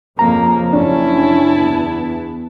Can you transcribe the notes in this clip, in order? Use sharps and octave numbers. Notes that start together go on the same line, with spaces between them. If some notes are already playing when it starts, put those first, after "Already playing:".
F2 C#3 F3 A#3 A#5
F#1 C#4 D4 E4 A5
E2 B3